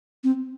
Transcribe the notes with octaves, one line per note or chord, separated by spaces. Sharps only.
C4